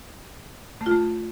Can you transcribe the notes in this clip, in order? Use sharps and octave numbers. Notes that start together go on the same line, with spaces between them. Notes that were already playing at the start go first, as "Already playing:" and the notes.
A3
F4
A3